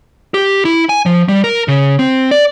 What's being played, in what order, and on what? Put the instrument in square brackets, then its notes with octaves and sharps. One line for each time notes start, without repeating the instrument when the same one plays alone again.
[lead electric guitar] G4
E4
G#5
F3
G3
A#4
C#3
C4
D5